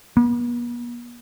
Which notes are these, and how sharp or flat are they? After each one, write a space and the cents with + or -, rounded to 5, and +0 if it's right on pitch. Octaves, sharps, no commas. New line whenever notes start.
B3 -45